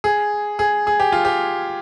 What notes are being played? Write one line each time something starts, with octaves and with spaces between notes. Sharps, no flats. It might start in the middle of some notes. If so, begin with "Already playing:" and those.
G#4
G#4
G#4
G4
F4
G4